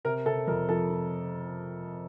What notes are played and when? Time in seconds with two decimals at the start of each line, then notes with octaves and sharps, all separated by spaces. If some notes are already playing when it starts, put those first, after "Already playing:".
0.05 C3 A#4
0.26 C3 A4
0.47 F2 A#4
0.69 F3 A4
0.90 F3